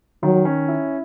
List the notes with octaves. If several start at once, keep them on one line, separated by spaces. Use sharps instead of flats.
D#3 F#3
C#4
E4